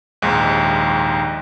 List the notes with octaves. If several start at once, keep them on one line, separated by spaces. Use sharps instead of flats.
A#1 D#2 G#2